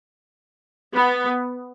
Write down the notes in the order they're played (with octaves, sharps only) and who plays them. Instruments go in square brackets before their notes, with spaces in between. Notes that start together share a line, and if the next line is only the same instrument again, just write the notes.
[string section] B3